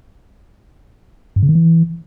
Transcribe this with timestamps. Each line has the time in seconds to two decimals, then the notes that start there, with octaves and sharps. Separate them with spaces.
1.36 G2
1.43 C#3
1.49 D#3
1.55 E3